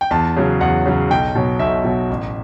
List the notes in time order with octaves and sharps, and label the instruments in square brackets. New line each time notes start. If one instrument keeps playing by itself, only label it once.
[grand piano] G5
E2 A5
C#3 F#3
E2 F#5
C#3 F#3
B1 G5
B2 F#3
B1 E5
B2 F#3
A1